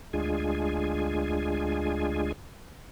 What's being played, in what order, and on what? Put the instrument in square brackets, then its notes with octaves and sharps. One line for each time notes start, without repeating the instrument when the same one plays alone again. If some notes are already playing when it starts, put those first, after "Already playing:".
[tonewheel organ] D2 G#3 D4 F4 G#4 G#5